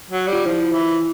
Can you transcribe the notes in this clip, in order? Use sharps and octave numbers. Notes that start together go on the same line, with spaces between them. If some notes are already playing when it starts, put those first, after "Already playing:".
F#3
G3
F4
F3 E4
E3